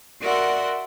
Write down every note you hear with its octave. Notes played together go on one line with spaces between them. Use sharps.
F#4 A#4 D5 E5 F#5 C6